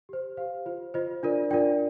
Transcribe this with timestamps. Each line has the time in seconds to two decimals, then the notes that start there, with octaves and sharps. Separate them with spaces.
0.09 G4 C5
0.37 G4 C5 F5
0.66 F4 C5
0.94 F4 C5 D#5
1.23 D4 F4 A#4 D5
1.51 D4 F4 A#4 D5 G5